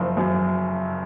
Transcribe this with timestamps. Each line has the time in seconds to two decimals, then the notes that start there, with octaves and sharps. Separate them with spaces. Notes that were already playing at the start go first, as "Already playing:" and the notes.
Already playing: F#1 F3
0.17 F#2